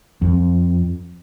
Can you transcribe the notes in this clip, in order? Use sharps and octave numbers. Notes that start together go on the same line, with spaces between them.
F2